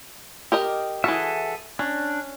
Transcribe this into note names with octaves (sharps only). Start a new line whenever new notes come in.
G4 A#4 D#5
E3 F#4 G#4 A4 E5
C#4 D4